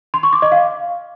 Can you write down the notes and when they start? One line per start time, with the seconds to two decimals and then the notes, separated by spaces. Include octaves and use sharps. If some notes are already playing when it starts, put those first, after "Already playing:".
0.14 C6
0.23 C#6
0.33 D6
0.42 D#5
0.52 F5